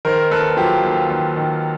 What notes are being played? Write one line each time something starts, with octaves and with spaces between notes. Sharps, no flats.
D#3 A#4 C5
D#2 A4 B4
F#3 F4 G4
D#2
D#2
D#3